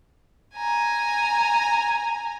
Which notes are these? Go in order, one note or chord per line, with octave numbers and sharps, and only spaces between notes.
G#5 A#5